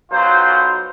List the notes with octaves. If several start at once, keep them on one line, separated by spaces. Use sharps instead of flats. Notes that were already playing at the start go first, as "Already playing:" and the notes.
B1 F#3 F4 C5